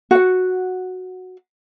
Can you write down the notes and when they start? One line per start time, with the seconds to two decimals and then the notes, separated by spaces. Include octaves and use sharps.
0.11 F#4 F#5